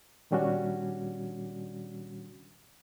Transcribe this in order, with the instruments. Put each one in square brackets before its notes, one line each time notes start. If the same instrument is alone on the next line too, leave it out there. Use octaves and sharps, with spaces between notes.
[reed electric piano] A#2 D#3 G3 C#4 D4 F#4